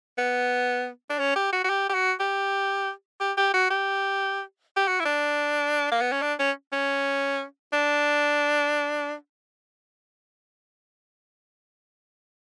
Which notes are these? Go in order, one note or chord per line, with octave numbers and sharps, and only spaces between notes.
B3
D4
C#4
G4
F#4
F#4
G4
G4
F#4
G4
G4
G4
F#4
G4
G4
F#4
E4
D4
A#3
B3
C#4
D4
C#4
C#4
D4